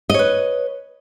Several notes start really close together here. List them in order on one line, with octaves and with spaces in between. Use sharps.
D#5 C#5 B4